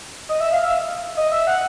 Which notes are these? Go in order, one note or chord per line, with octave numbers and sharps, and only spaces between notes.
D#5
E5
F5
E5
D#5
E5
F#5